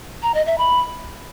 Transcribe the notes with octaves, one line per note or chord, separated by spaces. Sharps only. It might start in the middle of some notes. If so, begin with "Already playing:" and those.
A#5
D#5
E5
B5